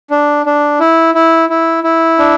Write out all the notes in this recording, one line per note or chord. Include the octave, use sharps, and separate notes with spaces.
D4
D4
E4
E4
E4
E4
D4